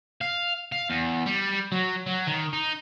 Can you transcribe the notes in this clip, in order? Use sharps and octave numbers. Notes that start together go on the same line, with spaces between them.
F5
F5
E2
G3
F#3
F#3
D#3
D#4